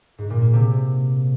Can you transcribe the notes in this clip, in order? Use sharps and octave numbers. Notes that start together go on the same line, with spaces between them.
G#2
A#2
A#3
C3